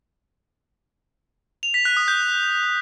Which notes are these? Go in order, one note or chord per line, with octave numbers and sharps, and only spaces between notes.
F7
B6
F#6
D#6
G6